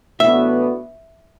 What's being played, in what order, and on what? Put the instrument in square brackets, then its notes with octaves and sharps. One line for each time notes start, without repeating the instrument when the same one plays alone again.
[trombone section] A2 E3 B3 D4 F#4 [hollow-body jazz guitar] E5